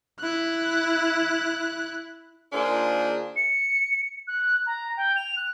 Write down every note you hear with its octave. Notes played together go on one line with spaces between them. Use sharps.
E4 F#6
D#3 A#3 D4 F4 G#4 C5
C#7
F#6
A#5
G5
F7
F#6